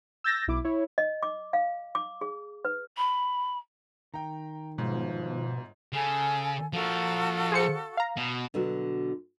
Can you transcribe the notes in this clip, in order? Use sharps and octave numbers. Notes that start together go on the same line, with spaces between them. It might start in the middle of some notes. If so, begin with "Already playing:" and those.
E6 G6 A6 A#6
B1 E4 D6
E4 C#5
D#5
D6
F5
D6
G#4
B4
B5
D#3 G5 A#5
G1 G#2 B2 F3
C#3 A4 G#5
F3 F#4 A4 A#4 F5
G#4 C5 C#7
F5 A#5
B2
B2 D3 F#3 F#4